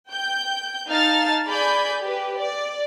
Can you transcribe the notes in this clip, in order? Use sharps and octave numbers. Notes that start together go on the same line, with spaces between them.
G5 G6
D#4 F5 A5 F6 A6
G#4 D5 G#5 B5 G6
G4 B4
D5